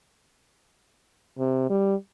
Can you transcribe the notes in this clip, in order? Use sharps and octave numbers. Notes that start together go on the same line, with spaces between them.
C3
G3